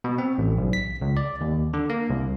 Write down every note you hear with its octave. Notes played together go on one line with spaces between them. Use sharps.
B2
C4
A1
B1
B6
C#2
D5
D#2
D3
A#3
C2